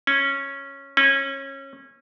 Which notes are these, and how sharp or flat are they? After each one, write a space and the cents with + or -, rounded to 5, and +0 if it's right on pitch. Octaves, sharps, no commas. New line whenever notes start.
C#4 -10
C#4 -25